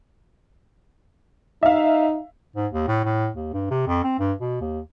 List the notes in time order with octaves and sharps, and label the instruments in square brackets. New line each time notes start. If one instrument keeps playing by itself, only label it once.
[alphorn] D#4 [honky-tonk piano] E5 F5
[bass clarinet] G#2
D#2
A2
A2
D#2
G2
C3
F2
C4
G2
B2
D#2